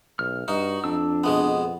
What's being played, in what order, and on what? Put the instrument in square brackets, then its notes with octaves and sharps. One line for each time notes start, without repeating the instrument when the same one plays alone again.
[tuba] B1 [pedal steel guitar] F6
[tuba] G2 [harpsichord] D#4 [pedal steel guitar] F#4
[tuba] F2 [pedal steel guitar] D4 E6
[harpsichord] B2 G#3 B3